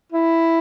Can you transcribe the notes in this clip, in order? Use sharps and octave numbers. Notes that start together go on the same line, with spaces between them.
E4